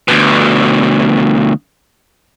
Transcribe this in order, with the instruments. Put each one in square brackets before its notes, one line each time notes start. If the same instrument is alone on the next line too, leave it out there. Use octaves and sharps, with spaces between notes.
[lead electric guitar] D2 B2